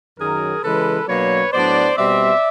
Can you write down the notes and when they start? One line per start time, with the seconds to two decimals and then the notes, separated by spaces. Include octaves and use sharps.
0.19 F#2 D#3 F#3 G#4 A#4
0.63 C#3 E3 G#3 A4 B4
1.08 B2 F#3 A#3 D4 B4 C#5
1.52 A2 F#3 B3 D4 C5 D5
1.97 B2 G3 C4 D5 E5